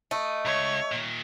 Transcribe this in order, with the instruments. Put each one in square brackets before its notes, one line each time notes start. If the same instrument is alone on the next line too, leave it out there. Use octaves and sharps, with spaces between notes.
[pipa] A3 [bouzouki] D#5
[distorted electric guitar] C#2 [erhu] C#5
[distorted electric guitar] A#2 D#3